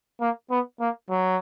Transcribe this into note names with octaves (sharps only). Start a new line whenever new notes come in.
A#3
B3
A#3
F#3